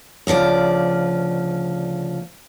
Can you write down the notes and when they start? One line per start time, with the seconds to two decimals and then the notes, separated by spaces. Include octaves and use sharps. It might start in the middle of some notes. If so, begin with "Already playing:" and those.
0.27 D2 C#3 F3 D5